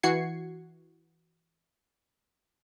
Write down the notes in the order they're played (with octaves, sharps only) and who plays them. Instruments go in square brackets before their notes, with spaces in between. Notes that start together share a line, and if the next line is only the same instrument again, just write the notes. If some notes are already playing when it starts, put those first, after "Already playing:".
[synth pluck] E3 F#4 F#5 G#6 C7 C#7